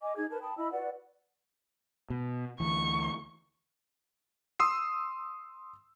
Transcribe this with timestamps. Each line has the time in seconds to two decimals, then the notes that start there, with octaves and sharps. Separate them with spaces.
0.02 D#5 G#5 D6
0.16 D#4 G#4 G#6
0.30 A#4 B4 A5
0.42 G5 A5 B5 D#6
0.57 E4 D#5 B5 E6
0.72 F#4 B4 D5 F#5
2.10 B2
2.60 D2 E3 C#6
4.59 C6 D#6 E6 C7